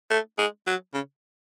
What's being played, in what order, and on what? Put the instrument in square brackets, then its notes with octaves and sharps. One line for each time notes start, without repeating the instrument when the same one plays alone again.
[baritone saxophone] A3
G#3
F#3
C#3